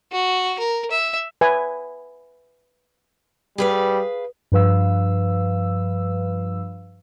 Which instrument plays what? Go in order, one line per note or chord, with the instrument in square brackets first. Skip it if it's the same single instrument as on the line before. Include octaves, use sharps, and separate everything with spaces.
[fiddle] F#4
A#4
E5
[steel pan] B4 E5 G#5
[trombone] G3 [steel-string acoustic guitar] G#4 B4 F5
[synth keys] G2 F3 B4 F5 E6